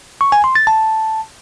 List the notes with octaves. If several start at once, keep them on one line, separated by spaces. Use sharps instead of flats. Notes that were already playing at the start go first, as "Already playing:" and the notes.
C#6
G#5
C6
A6
A5